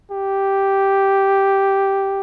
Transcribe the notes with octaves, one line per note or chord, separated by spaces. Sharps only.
G4